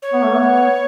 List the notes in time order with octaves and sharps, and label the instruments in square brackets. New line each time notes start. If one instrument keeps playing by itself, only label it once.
[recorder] C#5
[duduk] B3
A3
B3